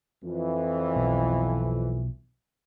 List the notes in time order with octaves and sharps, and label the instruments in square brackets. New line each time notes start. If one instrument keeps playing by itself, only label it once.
[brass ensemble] F2 E3
[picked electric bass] B1